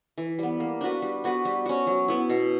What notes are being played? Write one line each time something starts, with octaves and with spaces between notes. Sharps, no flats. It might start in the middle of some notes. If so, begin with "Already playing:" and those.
E3
G3 B3
A#3
D4 F#4 B4
G3
B3 F#4 B4
G3
C#4 F#4
F#3
B3 E4
B2